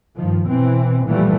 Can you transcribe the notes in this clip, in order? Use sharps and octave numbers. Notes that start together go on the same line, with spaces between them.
G2 D#3 F3
B2 E3 C4
A#2 E3 F3 G3 A3